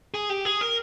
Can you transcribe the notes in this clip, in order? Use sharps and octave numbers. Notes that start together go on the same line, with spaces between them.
G#4
G4
G#4
A#4